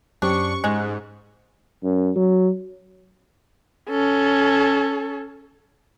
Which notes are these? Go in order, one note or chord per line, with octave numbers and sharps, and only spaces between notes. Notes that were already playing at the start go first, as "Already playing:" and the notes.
F#2 C#4 D4 G4 C5 C#6
G#2 G#3 F#6
F#2
F#3
C#4 A4